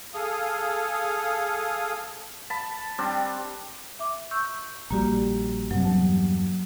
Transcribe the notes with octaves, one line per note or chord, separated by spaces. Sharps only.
G#4 A4 F5 D#6
A5 B5
G3 C4 D4
E5 D6
C#6 E6 G6
A#1 G3 A#3 F#4 G4
G2 C3 F#3
E2 G2 A5